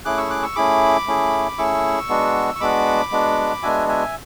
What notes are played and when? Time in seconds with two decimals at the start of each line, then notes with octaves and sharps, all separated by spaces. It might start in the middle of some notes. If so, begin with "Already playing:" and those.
0.05 A3 C#4 E4 G#4 D6 F#6
0.18 C#6 E6
0.30 D6 F#6
0.43 C#6 E6
0.56 A3 C#4 E4 G#4 B5 D6
1.07 A3 C#4 E4 G#4
1.58 A3 C#4 E4 G#4 C#6 E6
2.09 G#3 B3 D4 F#4
2.56 C#6
2.60 G#3 B3 D4 F#4 B5 D6
3.12 G#3 B3 D4 F#4
3.63 G#3 B3 D4 F#4 E5 G#5
3.89 E5 G#5